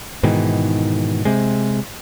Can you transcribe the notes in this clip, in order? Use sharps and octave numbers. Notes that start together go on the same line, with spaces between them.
G#2 B2 D#3 E3
C3 G#3